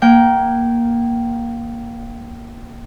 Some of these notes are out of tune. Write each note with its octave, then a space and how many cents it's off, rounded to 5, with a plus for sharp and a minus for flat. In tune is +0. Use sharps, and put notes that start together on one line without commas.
A#3 +10 G5 -20